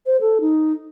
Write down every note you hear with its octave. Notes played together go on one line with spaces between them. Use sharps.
C5
A4
D#4